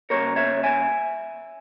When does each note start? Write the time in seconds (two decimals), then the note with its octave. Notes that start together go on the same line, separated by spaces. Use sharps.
0.10 C#3 G3 A#3 A#4 C#5
0.36 C#5 E5
0.63 E5 G#5